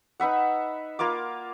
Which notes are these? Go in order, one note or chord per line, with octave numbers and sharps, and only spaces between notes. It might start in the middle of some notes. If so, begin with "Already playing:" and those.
D#4 B4 E5 F#5
A#3 F4 F5 D6